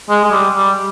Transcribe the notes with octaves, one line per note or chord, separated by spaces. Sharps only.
G#3
G#3
G3
G3